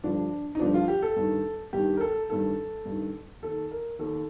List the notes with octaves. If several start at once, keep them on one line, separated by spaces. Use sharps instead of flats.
G2 D3 F3 D4
D#4
G2 D3 F3 D4
F4
G4
A4
G2 D#3
G2 D#3 G4
A#4
A4
G2 D#3 A4
G2 D#3
D#2 D#3 A4
A#4
D#2 D#3 A4